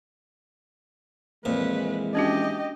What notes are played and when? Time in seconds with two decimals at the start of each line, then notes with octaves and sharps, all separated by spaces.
1.45 F2 A#2 E3 G#3 B4
2.15 C#4 D4 F#4 G4 D#5